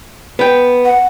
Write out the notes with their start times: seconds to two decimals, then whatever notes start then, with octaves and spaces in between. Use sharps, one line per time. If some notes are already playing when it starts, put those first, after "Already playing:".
0.39 B3 G5
0.85 F#5